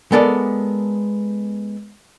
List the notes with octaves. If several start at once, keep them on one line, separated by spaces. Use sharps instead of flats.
G#3 B3 A4 A#4 D5